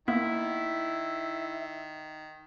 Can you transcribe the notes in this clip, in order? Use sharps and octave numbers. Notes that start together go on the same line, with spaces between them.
D#3 A#3 B3 E4 E5